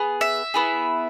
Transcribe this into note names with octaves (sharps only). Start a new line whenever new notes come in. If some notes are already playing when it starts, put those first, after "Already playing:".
Already playing: B3 G#4
E5
B3 E4 G#4